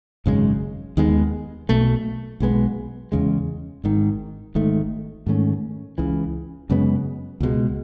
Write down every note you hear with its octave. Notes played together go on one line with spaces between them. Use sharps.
G#1 F#2 C#3 G#3
D#2 D#3 G#3 B3
B1 B2 A3
B1 B2 G#3 B3
E2 C#3 G#3
G#1 G#2 D#3
G#1 G#2 D#3 A3
G#2 D#3 A3 C#4
C#2 C#3 E3
F#2 C#3 G#3 B3
C#2 B2 G#3